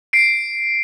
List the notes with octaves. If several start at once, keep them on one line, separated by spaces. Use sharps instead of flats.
C7 D7